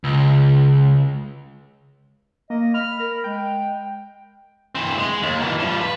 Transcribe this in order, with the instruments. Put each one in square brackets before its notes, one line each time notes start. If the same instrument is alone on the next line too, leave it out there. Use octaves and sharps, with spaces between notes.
[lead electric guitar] C#2
[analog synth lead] A#3 [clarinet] D#5
[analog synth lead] B5 [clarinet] F6
[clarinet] A#4
[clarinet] G#3 [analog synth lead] G5
[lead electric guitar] E3 C4
G#3
D#2
B2 E3
F3 G3
B4